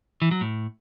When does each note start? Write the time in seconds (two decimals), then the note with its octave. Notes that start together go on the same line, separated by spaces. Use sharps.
0.22 E3
0.31 F#3
0.41 A2